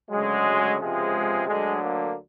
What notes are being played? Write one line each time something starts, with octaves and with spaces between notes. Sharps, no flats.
D2 C#3 F#3 G#3
C#2 C3 F3 G#3
D2 D3 F#3 G#3
A#3